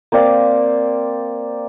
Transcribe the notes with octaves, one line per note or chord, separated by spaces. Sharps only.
A#3 C4 D5 F5